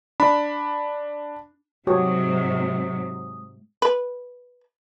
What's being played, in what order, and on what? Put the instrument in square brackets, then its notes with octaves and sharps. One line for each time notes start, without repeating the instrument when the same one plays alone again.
[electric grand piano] D4 B5
[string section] G#2 C3 F#3 [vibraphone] G#3 D#6 [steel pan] F#4 G4 C#5
[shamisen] B4